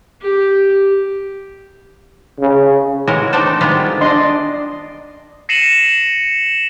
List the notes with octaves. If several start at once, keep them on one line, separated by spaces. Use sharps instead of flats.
G4
C#3
C#3 E3 G#3 F#4 A#4
A3 C4 D4 D#4 A4 C5
D#3 G3 G#3 B3 C4 F4
D4 D5 D#5 C6
A#6 C7 C#7 D#7 E7 F#7